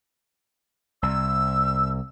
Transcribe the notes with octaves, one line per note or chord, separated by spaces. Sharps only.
C2 E6